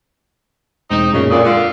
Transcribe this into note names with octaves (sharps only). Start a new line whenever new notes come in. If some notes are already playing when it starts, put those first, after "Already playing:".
E1 C4 D#4
F#2 A#2 C#3 G#3
F2 A#2 D3 D#6
D3 F4